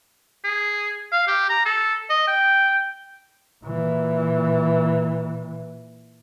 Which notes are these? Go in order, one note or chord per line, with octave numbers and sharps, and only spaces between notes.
G#4
F5
G4
A#5
A4
D#5
G5
A#2 E3